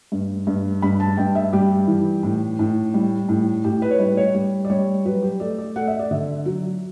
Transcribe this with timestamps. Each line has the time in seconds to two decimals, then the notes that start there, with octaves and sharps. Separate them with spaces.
0.12 G2
0.47 G2
0.82 G2 B5
1.00 A5
1.17 G2 G5
1.35 E5
1.53 G3 G4
1.88 E3
2.23 A2
2.59 A2
2.94 G3
3.29 A2
3.64 A2 G4
3.82 B4
3.91 C#5
3.99 G3 B4
4.17 C#5
4.34 G3
4.65 D5
4.70 G3 C#5
5.05 F#3 B4
5.23 G4
5.40 A3 D5
5.58 D5
5.76 A3 F#5
5.88 E5
5.99 D5
6.11 D3 E5
6.46 F#3